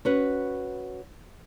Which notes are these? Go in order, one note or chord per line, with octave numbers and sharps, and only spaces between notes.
C#4 F#4 B4